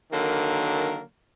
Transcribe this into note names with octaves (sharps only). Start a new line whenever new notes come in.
D3 D#3 F#3 A#3 A#4